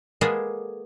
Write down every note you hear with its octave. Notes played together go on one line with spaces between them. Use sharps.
G#3 A#3 B3 G#4 A4